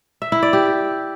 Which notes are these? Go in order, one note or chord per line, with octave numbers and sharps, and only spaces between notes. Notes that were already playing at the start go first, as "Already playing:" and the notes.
E5
E4
D5
G4